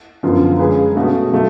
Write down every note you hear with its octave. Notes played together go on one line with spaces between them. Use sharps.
F#2 D3 F3 B3 F4
G#3 C#4 G#4 B4
B2 A3 C#4 F#4 A4
F#3 A3